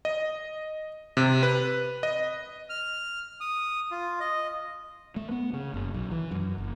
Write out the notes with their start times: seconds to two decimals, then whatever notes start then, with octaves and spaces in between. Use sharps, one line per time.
0.05 D#5
1.17 C3
1.43 B4
2.03 D#5
2.69 F6
3.41 D#6
3.91 F4
4.20 D#5
5.16 A3
5.31 B3
5.53 C#3
5.74 F#1
5.94 B1
6.11 E3
6.31 F#2
6.58 F#1